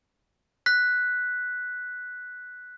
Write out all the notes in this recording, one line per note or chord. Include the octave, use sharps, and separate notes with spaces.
F#6 B6